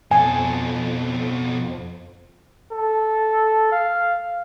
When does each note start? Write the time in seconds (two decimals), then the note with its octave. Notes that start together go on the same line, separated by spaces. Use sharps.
0.11 F2 B2 A4 G#5
2.72 A4
3.72 F5